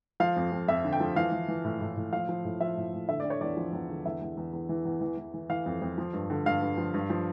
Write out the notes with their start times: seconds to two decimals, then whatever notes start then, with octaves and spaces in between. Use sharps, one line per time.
0.20 F3 F5
0.36 F2
0.52 F2
0.68 F2 E5
0.85 D3
0.93 G5
1.00 F3
1.16 E3 F5
1.32 E3
1.48 E3
1.64 A2
1.81 A2
1.96 A2
2.13 F3 F5
2.29 F3
2.44 A2
2.60 F3 E5
2.77 A2
2.93 A2
3.09 D3 E5
3.20 D5
3.25 D3
3.30 C#5
3.41 E2 D5
3.57 F3
3.73 E2
3.89 D3
4.06 E2 E5
4.22 E2
4.37 E2
4.53 E2
4.69 E3
4.85 E2
5.01 E3
5.17 E3
5.34 E3
5.50 E3 F5
5.66 F2
5.82 F2
5.98 F3
6.13 G2
6.30 D3
6.46 G2 F5
6.62 G2
6.77 F3
6.94 G2
7.10 F3